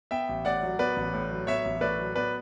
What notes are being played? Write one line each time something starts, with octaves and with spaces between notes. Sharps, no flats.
B3 E5 G5
A1
A2 D5 F#5
F#3
B3 B4 D5
A1
A2
F#3
B3 C#5 E5
A1
A2 B4 D5
F#3
B3 B4 D5